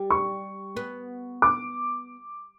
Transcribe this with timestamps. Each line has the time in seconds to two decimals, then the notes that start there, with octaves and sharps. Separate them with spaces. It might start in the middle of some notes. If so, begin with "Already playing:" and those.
Already playing: G3
0.10 C#6
0.77 B3
1.42 D6